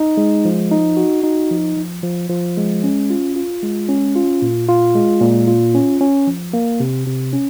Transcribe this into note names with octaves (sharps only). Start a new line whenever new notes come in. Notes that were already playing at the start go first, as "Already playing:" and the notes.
Already playing: D#4
G#3
F3
D#4
F#4
D#4
F3
F3
F3
F3
G#3
C#4
F4
F4
G#3
C#4
F4
A#2
F4
G#3
A#2
F4
C#4
C#4
F3
A#3
C3
C3
C#4